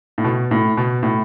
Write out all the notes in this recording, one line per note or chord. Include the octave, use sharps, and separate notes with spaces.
A2
B2
A2
B2
A2